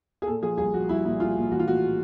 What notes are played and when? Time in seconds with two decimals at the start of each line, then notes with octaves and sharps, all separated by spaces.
0.22 G#4
0.27 A#2 A4
0.42 F3 G#4
0.58 C2 G#4
0.74 F3 F#4
0.89 C2 E4
1.05 A#2 E4
1.20 C2 F4
1.36 A#2
1.51 E3 F#4
1.59 F4
1.67 A2 F#4